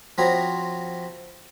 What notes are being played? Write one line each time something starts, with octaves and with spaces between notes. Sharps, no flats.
F3 C4 F#4 C#5 A#5 B5